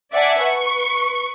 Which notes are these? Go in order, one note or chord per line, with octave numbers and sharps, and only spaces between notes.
D5 E5 F#5 G#5 A5 D6
B4 C#6